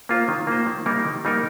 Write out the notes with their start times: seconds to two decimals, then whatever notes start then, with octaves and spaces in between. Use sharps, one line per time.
0.09 A#3 F4 C5
0.28 D#3
0.47 A#3 F4 C5
0.66 D#3
0.86 G3 A#3 D#4 A#4
1.05 D#3
1.25 G3 A#3 D#4 A#4